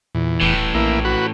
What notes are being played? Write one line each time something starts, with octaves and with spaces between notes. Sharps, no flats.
E2 A#2
D#1 A2 E3
A#1 A#3 E4
F#4 B4